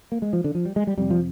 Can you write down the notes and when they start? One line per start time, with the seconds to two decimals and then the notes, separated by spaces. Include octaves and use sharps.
0.12 A#3
0.22 G#3
0.33 F3
0.44 D3
0.55 F3
0.65 G3
0.76 G#3
0.87 G3
0.97 F2 C3 G3
1.10 F3